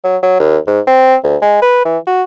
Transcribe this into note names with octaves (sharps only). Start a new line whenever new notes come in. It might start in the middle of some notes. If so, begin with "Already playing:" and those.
F#3
F#3
D#2
G#2
C4
D2
G#3
B4
E3
F#4